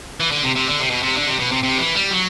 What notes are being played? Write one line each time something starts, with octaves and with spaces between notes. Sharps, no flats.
E3
D3
C3
C3
D3
C3
B2
C3
D3
C3
B2
C3
C3
E3
G3
F#3